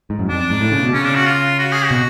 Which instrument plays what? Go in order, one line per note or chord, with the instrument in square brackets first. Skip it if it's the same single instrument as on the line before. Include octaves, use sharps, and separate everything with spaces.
[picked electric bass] G#2
F#2
[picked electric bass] F2 [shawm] D4
[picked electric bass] G#2
A2
C#3
B2
[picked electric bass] C#3 [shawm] C#4
[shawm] D4
F#4
F4
F#4
G#4
F#4
[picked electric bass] B2